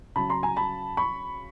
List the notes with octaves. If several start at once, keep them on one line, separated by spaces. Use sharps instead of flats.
C#3 F#3 A5 B5
A#5 C6
G#5 A#5
A5 B5
B5 C#6